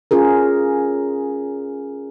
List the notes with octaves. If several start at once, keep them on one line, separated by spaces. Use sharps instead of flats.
C#4 F4 G#4 A#4